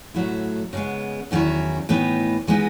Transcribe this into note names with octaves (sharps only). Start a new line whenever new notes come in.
A2 F#3 A3 E4
C#3 G#3 B3
E2 D#3 F#3 C#4 E4
A2 E3 B3 D#4
E3 G#3 B3 D#4